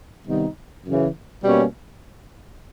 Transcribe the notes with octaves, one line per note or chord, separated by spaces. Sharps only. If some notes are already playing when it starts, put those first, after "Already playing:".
C3 D#3 G3 B3 D#4
F#2 C#3 E3
B2 G3 A#3 C#4